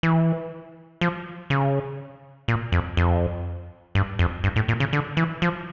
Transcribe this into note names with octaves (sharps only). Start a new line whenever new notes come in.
E3
F3
C#3
A#2
F2
F2
G2
F2
G2
A2
A#2
C#3
D3
E3
F3